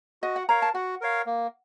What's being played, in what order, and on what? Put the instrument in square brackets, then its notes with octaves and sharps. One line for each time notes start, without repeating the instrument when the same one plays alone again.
[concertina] F#4 [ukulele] D#5
[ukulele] F#5
[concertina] A#4 C#5 F5 [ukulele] A#5
[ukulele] A5
[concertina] F#4 [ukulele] F#5
[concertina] A#4 C#5 F5
A#3